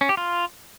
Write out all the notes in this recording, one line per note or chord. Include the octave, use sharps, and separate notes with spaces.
C#4
G4
F4